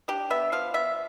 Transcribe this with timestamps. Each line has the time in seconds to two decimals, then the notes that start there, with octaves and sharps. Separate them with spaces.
0.08 D4 G4
0.30 B3 E5
0.52 F3 F5
0.74 B3 E5